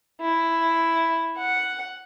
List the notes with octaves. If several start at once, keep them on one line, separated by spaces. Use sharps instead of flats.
E4
F#5